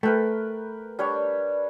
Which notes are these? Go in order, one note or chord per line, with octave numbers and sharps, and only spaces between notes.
A3 A#4 B4 G5
G3 D4 C#5